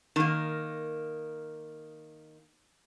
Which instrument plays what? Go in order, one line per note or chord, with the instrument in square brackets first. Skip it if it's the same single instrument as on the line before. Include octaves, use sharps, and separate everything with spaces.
[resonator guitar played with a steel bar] D#3 A#3